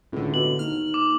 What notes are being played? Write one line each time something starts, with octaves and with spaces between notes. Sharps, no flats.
C#2 A2 D3
B2 F#7
D#2 F6
D6